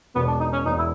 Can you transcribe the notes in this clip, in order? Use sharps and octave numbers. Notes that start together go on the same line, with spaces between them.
E1 E2 B2 B3
D4
D#4
C#4
E1 E2 B2 D#4
E4